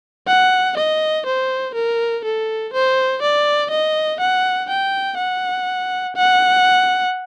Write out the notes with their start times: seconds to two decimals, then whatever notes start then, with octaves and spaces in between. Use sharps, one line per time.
0.27 F#5
0.77 D#5
1.26 C5
1.75 A#4
2.24 A4
2.73 C5
3.22 D5
3.71 D#5
4.20 F#5
4.69 G5
5.18 F#5
6.16 F#5